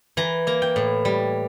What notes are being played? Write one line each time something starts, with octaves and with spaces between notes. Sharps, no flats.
E3 A#5
A#3 A#5
G5
A2
G3